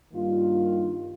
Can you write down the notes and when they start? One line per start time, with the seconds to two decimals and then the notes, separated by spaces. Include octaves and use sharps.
0.13 G2 D#3 A#3 F4